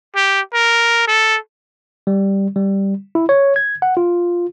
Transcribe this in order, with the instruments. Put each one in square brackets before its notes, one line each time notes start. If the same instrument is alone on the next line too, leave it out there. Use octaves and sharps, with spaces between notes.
[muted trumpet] G4
A#4
A4
[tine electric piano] G3
G3
E4
C#5
G#6
F#5
F4